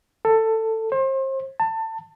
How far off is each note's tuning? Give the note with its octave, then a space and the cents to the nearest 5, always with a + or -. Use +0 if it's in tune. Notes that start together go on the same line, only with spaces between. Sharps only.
A4 +15
C5 +35
A5 +25